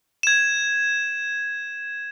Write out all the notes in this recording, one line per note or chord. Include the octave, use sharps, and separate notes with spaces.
G#6 E7